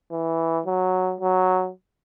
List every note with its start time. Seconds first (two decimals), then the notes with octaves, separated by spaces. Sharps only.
0.12 E3
0.66 F#3
1.20 F#3